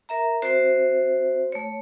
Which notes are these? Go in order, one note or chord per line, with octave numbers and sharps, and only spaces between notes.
A#4 E5 A#5
C4 F#4 C5 E5
A3 C#5